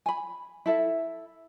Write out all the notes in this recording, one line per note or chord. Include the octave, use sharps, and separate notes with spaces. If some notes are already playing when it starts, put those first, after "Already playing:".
G#5 B5
E4 A4 E5